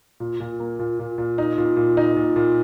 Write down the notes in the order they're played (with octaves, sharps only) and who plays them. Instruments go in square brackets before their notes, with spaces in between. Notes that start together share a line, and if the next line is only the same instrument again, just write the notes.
[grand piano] A#2
A#2
A#3
A#2
A#2
A#2
D#4
A#2
A#2
D#4
A#2
A#2